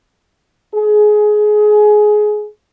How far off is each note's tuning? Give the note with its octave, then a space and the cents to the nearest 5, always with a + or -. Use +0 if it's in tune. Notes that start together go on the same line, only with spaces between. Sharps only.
G#4 +20